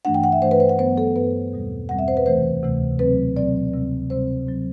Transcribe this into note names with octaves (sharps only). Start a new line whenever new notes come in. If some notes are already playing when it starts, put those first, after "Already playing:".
G2 E3 A3 D4 F#5
G5
F#5
E5
G2 E3 A3 D4 C5
B4
C5
F#5
G2 F#3 B3 C5
A4
G2 F#3 B3 B4
E2 B2 G3 C4
E2 B2 G3 C4 F#5
E5
C5
B4
D2 C3 E3 A3 C5
D2 C3 E3 A3
B2 F#3 C4 B4
B2 F#3 C4 D5
D2 C3 G3 C4
D2 C3 G3 C4 C5
F#3 C4